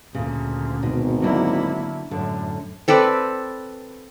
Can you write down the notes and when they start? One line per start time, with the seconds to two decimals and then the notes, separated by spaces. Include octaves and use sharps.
0.15 D2 A#2 C#3
0.83 G#1 B2
1.22 D3 F#3 A#3 E4
2.11 F#2 A2 D3
2.88 C4 A4 B4 D5